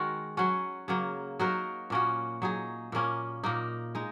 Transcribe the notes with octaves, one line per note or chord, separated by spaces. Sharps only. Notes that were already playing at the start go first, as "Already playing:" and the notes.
Already playing: D#3 G#3 F#4 A#4
F#3 C#4 F#4
C#3 F#3 A#3
F#3 D#4 F#4 A#4
A#2 A#3 C#4 F#4
F#3 D#4 G#4
A#2 A#3 C#4
A#2 A#3 D#4
G#3 D#4